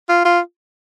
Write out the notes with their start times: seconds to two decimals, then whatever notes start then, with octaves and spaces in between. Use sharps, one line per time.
0.09 F4
0.25 F4